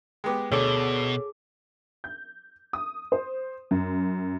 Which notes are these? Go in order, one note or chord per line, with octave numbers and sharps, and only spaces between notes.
G#3 B3 G4 G5 D6
D2 B2 G#4 A4 C#5 D6
G6
D#6
C5
F#2